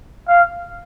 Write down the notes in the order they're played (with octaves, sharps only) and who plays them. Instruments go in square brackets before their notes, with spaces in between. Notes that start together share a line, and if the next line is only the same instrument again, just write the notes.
[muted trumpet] F5